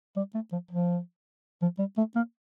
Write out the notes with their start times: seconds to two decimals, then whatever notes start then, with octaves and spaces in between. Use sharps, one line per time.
0.17 G3
0.34 A3
0.52 F3
0.71 F3
1.62 F3
1.79 G3
1.98 A3
2.16 A#3